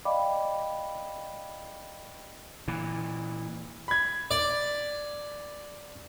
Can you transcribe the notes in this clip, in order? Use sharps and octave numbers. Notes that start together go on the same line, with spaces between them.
D5 D#5 F5 G5 B5 D6
A#2 E3
B5 G#6
D5